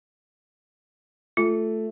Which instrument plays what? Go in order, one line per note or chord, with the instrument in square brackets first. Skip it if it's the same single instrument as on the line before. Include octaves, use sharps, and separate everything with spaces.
[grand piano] A3 [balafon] F4